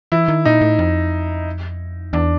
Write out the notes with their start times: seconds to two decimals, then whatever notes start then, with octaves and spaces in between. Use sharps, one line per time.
0.12 E3 E4
0.28 D#3
0.45 A#2 D#4
0.61 A2
0.79 F2
2.13 E2 D4